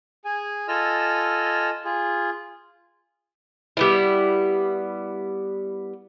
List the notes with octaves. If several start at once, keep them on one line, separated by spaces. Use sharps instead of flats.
G#4 G#5
F4 A4 D#5 G#5 E6 F6
F4 G#4
G3 B3 E4